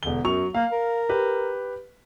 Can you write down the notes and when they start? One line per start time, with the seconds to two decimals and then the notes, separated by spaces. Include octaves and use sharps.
0.03 E1 D3 G7
0.24 F#2 F#3 C#6 F7
0.55 A#3 F5
0.72 A#4
1.09 G4 B4